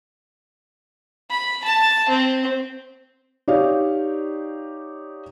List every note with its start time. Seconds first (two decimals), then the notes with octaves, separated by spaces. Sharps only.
1.30 B5
1.64 A5
2.09 C4
3.48 D#4 G4 C#5 D5 F5